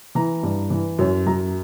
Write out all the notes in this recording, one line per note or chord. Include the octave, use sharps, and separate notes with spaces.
E3 A#5
G2
E3
F#2 C#5
F#2 A#5